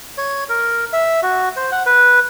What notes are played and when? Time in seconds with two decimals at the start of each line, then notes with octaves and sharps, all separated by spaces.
0.18 C#5
0.49 A#4
0.93 E5
1.23 F#4
1.57 C5
1.72 F#5
1.86 B4